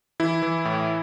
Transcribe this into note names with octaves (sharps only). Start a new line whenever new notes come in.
E3 E4
E3
A2